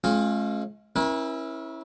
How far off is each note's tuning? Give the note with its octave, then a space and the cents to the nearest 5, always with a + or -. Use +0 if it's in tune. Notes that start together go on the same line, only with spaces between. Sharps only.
G#3 +40 C#4 -35 F4 +0
C#4 -30 E4 -15 A#4 +40